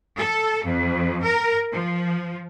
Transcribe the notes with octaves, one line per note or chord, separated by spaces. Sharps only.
A4
F2
A#4
F3